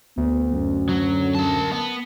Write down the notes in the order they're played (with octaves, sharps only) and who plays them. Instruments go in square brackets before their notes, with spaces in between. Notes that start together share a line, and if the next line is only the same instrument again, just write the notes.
[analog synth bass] D2 [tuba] B3
[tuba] F#2
[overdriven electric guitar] F#3
A#4 A5
B3